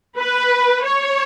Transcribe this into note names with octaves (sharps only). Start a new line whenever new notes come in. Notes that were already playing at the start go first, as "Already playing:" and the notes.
B4
C#5